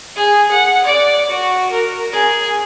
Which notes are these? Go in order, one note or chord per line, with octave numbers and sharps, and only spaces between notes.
G#4
F#5
D5
F#4
A#4
G#4